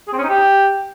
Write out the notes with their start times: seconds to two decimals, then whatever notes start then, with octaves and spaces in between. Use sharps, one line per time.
0.08 G#4
0.13 C4
0.18 C#4
0.24 D#4
0.29 G4